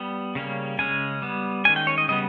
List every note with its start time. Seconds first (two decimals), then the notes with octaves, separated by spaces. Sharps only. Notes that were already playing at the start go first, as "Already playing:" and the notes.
Already playing: G3 B3
0.35 C#3 G3 A#3 C#4
0.79 C#3 G#3 C#4 G#5
1.22 G3 B3
1.65 D#3 G#3 C#4 G#5
1.76 G5
1.87 C#5
1.98 D#5
2.08 C#3 G3 B3 D#5